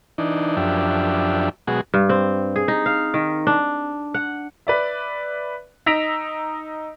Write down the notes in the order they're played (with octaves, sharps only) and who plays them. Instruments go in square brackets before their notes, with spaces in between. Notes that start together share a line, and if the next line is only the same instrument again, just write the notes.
[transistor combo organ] E3 D4 D#4
F#2 F3 D4 G4 E5
B2 F#3 G#3 F#4 G#4
[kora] G2
C4
G#4
D#4
F5
D#3
D4
F#5
[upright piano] B4 D5 E5
D#4 E6 A#6 B6 D7 F7